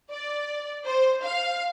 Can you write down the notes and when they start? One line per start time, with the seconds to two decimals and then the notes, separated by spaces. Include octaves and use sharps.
0.10 D5
0.84 C5
1.23 F5